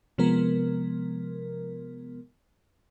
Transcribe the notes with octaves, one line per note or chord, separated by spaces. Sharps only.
C3 F3 G#3 B3 A#4